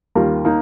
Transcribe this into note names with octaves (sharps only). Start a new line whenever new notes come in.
D#2 D#3 G3 F4 A#4
A#3 D#4